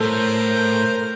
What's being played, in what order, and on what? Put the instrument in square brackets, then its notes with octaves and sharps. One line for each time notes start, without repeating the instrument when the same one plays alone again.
[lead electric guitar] A2 [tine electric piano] A4 [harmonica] A#4 C5